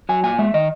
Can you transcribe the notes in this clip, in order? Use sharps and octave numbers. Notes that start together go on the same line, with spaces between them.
F#3 G#5
A#2 G#5
G#3 E5
D#3 D#5